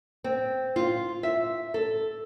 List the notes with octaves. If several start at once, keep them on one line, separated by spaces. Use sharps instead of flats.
C4
F4
E5
A4